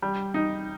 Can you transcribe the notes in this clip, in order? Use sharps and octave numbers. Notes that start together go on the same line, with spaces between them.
G3
D#4